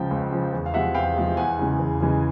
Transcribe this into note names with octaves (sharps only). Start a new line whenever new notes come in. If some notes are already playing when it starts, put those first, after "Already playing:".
Already playing: C#2 C#3 F3 G5 A5
C#2
C#3 F3
E2
F5
C3 F3 G#3 E5 F#5
E2 F5 G5
C3 F3 G#3
E2 F#5 G#5
C#3 E3 G#3
E2
C#3 E3 G#3